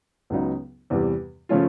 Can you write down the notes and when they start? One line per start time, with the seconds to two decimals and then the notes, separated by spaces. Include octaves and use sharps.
0.30 C#2 C#3 F#3 B3 D#4
0.90 E2 C3 E3 G3
1.49 C#3 F3 A3 C#4 F4